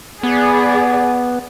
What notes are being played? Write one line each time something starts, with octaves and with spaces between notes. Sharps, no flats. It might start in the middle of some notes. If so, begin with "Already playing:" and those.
B3 G#4 D5